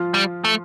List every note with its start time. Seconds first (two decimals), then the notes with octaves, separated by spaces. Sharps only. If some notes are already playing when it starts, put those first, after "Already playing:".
Already playing: F3 F4
0.14 G3
0.44 A3